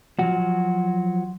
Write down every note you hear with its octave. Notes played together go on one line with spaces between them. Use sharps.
F3 F#3 F#4